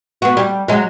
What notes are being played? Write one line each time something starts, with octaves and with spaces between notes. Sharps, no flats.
B3 F#4
G3
F#3 G#3